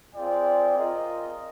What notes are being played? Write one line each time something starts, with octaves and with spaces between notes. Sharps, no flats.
C4 F4 G#4 D5 G5
F4 A#4 D#5